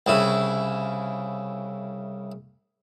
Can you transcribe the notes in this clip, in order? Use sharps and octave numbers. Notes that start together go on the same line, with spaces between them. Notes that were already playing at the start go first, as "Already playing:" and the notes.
C2 C#3 E4